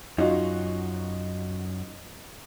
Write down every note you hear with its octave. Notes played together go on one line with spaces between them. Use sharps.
F#2 D#4 F4 F#4